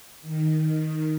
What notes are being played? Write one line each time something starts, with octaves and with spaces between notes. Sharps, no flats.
D#3